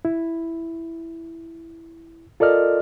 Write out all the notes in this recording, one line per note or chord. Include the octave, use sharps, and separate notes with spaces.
E4
F4 A4 A#4 D5 D#5 F6